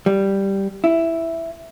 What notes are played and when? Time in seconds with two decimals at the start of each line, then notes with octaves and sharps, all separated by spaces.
0.06 G3
0.84 E4